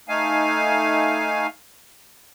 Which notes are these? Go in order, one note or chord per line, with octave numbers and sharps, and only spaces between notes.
A3 D#4 F5 G#5